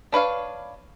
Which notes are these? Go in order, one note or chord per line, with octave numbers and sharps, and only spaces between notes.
D4 B4 C#5 F5